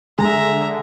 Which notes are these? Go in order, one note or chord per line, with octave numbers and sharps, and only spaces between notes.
D3 G#3 G#4 E5 A#5